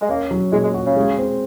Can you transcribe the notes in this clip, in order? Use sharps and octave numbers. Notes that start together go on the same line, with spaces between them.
G#3
A#3 C#4
F#3
A#2 G#3
G#3
F#4
C#3
G#3
C4